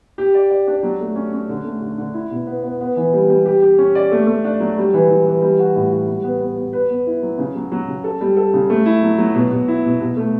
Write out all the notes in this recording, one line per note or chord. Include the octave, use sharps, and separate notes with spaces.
G4
D5
D5
D4
F#3
A3
C#4
C#4
D3
A3
D3
D3
E4
B2
B3
B3
B3
E3
G3
G3
G4
G4
C#4
D5
A3
A3
D4
F#3
G3
E3
E3
E3
G3
F#4
A2
F#4
G3
B3
B3
B3
B4
B3
E4
F#3
C#3
F#3
F#3
C#3
A4
G3
A4
C#3
A3
E4
F#3
F#3
B2
B2
E4
B2
B2
A3